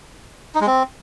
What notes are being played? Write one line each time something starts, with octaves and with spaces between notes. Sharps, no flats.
D#4
G#3
C4